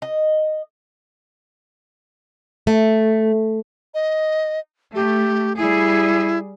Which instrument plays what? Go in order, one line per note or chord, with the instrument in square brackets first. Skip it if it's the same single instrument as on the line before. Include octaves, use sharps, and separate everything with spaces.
[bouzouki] D#5
[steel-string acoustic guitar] A3
[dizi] D#5
[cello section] A3 [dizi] G4
[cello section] G3 G#4 [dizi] E4